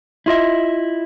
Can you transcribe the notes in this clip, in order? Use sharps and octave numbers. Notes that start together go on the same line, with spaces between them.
E4 F4 D#5 E5